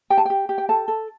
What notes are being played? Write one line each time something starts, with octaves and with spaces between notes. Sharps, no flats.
G4 G5
A5
G4 G5
G4
G5
A4 A5
A4